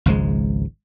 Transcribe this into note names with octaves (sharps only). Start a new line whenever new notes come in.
G#1 C#2 F3 G#3